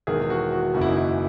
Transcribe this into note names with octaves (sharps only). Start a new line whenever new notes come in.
E1 E2 D#3 G#4
F#4
F#4
F#1 F#2 C#3 F#4
E4
D#4
E4